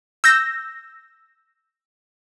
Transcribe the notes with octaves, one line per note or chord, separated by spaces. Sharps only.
E6 G6 A#6